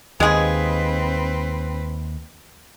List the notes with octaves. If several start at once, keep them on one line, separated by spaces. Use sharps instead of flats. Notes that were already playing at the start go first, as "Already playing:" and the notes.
D#2 G#3 C4 G#4 B4